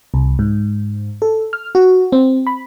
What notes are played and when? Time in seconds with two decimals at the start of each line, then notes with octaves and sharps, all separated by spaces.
0.14 C2
0.39 G#2
1.22 A4
1.53 F6
1.75 F#4
2.12 C4
2.47 B5